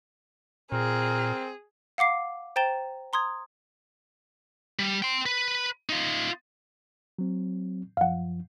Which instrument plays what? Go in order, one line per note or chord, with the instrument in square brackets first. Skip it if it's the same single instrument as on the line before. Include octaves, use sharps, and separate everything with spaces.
[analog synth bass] A#2 [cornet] C4 [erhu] G#4 [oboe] A#4
[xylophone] F5 F#5 D6 C7
C5 G5 A#5 A6 E7 G7
A#5 C6 D#6 G#6
[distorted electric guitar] G3
G5 C6
B4
D#4 F4
[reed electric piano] F#3 C4
[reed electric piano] F#2 F3 [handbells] F5 F#5